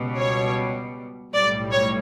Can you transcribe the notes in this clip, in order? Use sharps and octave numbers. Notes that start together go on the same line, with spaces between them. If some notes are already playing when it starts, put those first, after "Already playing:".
Already playing: C#2 B2 G3
C#5
B1 A2 G3 D5
C#5